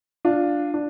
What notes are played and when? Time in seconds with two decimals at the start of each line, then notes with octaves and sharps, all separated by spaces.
0.25 D4 F4
0.74 D4